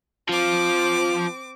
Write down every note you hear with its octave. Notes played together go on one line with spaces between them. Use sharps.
F3 C4 D6